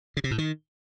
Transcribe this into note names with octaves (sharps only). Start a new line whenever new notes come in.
C#3
C3
A2
D#3